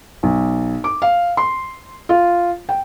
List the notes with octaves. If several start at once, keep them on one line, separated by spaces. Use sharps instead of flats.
B1
D6
F5
C6
F4
G5